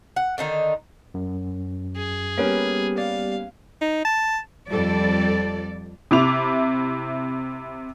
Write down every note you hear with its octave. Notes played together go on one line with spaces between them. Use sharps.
F#5
D3 D#3 D#4
F#2
G#4
G3 A#3 B3 C#4 G4 B4
D5 F5
D#4
A5
F2 G3 A4 D5
C3 E4 D6 F7